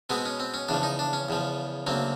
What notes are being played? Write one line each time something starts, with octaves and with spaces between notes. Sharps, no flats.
B2 G#3 B3 C4
C#4
C4
C#4
E2 C#3 F3 D4
D#4
D4
C#4
E2 C#3 F3
D2 C#3 F#3 A#3 C4